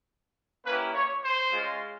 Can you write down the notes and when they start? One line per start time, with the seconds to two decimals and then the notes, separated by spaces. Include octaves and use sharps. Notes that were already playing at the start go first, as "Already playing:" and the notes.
0.65 A#3 C#4 E4 G4 B4
0.94 C#5
1.23 C5
1.51 G#3 C#4 F4